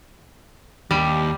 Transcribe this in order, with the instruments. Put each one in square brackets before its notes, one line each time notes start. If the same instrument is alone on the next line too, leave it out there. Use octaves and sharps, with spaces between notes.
[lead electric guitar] D#2 [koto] G3